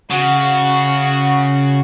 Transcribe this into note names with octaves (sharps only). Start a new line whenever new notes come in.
C#3 F#4